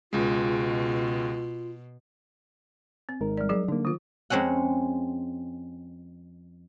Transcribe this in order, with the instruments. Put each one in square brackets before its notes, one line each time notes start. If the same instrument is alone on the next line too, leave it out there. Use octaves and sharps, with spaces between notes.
[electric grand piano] C#2 G#3 [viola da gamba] B2 [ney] F4
[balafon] C4
[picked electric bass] G#1 [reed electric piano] G#3 D#4 A#4
[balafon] G3 D5
F#3 G#4 D5
[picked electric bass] D3 A#3 [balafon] D#4
[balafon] D#3 F4 [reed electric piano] D#6
[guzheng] F2 G#3 C4 C#4 F#5